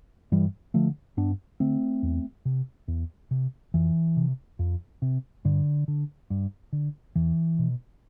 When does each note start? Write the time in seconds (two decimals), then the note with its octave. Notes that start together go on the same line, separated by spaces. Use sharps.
0.32 G2 E3 G3
0.74 D3 F3 A3
1.17 G2 B3 D4
1.60 D3 A3 C4
2.03 E2
2.45 C3
2.88 E2
3.31 C3
3.74 F2 E3
4.17 C3
4.59 F2
5.02 C3
5.45 G2 D3
5.88 D3
6.30 G2
6.73 D3
7.15 E2 E3
7.59 B2